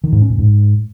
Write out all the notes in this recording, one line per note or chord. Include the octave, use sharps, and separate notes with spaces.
D#3
G#2
C#4
A2
G#2